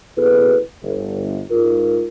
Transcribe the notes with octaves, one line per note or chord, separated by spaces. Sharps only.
F#1 B2 E4 G#4 A4 B4
G1
G#2 F4 A#4